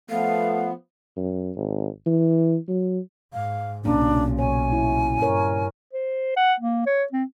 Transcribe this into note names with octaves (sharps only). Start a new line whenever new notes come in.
F3 A3 B3 F5
F#2
G#1
E3
F#3
G#2 F5
B1 A#2 C#3 D4
C#5 G#5
E4
G2 A#4 C#5
C5
F#5
A#3
C#5
C4